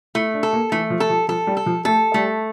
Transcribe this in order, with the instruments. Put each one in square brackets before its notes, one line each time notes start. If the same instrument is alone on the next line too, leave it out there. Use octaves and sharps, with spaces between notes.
[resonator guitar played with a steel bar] A3 [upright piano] E4
[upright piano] D4
[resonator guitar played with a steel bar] A4
[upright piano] A#3
[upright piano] E3 [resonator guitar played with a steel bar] A3
[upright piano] F3
[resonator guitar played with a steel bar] A4
[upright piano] F3
[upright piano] F3 [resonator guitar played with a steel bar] A4
[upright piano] G3
[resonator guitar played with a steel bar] A4
[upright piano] F3
[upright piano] A3 [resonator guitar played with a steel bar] A4
[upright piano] G3 [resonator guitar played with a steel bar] A3